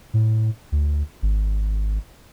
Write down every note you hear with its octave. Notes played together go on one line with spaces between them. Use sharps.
A2
D2
G#1